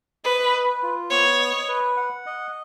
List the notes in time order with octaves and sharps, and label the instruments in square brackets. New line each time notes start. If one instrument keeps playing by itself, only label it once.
[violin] B4 [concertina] D#5
[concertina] B4
F4
[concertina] B3 [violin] C#5
[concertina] D#5
B4
F#5
D#5